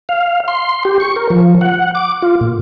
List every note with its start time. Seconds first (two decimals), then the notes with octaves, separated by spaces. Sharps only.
0.09 F5
0.48 C6
0.85 G4
1.00 C#6
1.16 A#4
1.30 F3
1.61 F#5
1.95 D6
2.22 F4
2.41 A#2